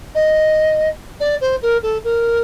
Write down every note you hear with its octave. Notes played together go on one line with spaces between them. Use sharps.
D#5
D5
C5
A#4
A4
A#4